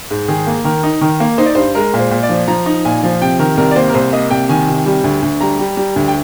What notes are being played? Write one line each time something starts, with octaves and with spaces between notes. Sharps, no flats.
G#2
D#3 G#4
A#3
D#3 A#4
D#4
D#3 A#4
A#3
D#4 C5
D5
G2 C5
G#3 A#4
A#2
C5
A#2
D5
F3
F3 A#5
D#4
A#2 G#5
F3
C3 G5
D#3 A#4
C2 A#4
D5
A#3 C5
A#4
C2 C5
A#3 D#5
C2 G5
D#3 G#5
C3
G3
D2
D2
G3 A#5
G3
G3
D2
G5